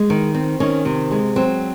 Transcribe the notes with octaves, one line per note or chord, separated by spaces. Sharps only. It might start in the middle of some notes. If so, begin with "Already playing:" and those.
Already playing: G#3
D#3
C4
D#3 C#4
C3
G#3
F#3 C4